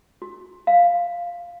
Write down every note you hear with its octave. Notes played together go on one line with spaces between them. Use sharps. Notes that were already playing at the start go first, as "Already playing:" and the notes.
F#4
F5